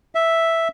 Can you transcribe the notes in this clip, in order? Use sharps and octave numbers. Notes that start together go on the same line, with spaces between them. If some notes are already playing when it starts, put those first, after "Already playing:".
E5